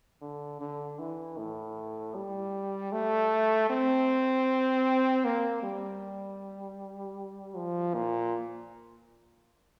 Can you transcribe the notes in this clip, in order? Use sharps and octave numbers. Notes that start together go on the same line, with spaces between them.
D3
D3
E3
A2
G3
A3
C4
A#3
G3
F3
A#2